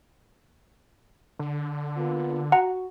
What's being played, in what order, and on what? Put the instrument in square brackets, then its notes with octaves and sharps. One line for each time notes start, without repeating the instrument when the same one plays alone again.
[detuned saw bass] D3
[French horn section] A#3 B3 F4
[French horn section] F#4 [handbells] F#5 A#5